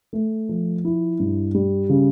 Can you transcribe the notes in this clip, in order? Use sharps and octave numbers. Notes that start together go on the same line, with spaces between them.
A3
F3
E4
G2
G3
C#3